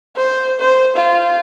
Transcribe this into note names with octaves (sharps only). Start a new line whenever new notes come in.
C5
C5
F4